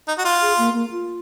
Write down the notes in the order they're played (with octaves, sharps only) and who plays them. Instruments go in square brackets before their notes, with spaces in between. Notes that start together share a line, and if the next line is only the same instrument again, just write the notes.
[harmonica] D#4
F#4
F4
[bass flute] G#4
A#3
A#3
F4